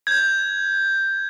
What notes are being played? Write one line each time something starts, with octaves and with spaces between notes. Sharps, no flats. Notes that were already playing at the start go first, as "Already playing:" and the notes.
G6 G#6